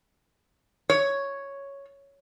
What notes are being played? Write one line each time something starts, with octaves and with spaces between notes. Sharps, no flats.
C#5